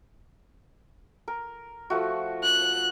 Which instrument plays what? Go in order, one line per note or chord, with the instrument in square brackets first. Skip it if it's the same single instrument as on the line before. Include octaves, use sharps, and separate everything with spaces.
[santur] A#4
F3 A3 F#4
[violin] F#6